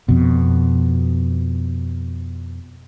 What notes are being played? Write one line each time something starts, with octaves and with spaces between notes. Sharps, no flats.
F2 B2